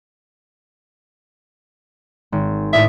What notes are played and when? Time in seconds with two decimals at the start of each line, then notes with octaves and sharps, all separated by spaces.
2.32 G#1
2.73 A2 D5 E5 D#6